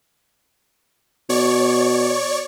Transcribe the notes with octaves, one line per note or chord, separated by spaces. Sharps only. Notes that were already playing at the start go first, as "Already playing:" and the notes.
B2 C#5 D5 C#6